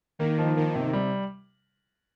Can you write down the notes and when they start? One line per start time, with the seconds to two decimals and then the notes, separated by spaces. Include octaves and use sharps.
0.19 D#3 A#3
0.38 F3
0.56 D#3 A#3
0.75 C3
0.93 G3